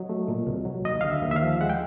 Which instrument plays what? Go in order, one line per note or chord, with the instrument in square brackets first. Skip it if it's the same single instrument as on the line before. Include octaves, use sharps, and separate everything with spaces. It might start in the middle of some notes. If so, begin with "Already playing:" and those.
Already playing: [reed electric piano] F#3 D#5
A3
A#2
C2
F#3
D#2 D#5
D3 F5
E5
D#2
E5
F5
F3
G#3 F#5
G5